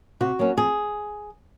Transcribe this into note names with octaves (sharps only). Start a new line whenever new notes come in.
C3 F#4
F#3 A#3 C#4
F2 G#4